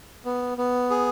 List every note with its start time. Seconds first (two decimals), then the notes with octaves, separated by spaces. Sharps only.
0.25 B3
0.58 B3
0.90 G#4